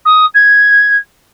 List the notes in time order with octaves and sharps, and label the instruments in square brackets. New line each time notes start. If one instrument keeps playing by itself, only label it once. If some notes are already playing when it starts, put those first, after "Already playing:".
[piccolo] D#6
G#6